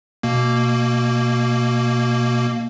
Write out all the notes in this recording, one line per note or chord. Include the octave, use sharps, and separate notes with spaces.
B2 A#3